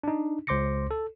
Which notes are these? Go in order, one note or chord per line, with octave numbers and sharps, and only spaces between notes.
D4 D#4
C#2 C5 C6 D6 A#6 C#7
A4